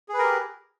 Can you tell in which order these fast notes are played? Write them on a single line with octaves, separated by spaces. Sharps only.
G#4 B4 A#4 G4